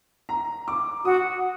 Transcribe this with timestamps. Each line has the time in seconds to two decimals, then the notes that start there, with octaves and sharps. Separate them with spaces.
0.29 A#5
0.68 D6
1.05 F#4 D#6